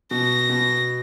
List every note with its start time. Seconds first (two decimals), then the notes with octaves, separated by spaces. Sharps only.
0.11 B2 A#6
0.50 B2